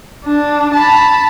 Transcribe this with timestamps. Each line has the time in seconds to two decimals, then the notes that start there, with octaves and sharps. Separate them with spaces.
0.25 D4
0.74 A5 B5